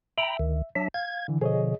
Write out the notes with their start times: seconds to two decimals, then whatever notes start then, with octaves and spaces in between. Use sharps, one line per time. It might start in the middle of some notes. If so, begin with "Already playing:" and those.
0.18 E5 G5 A#5 B5
0.39 D2 D#3
0.75 F#3 D4 E5
0.94 F5 G#6
1.28 D3 E3
1.41 B2 D3 F3 G#4 C#5 D#5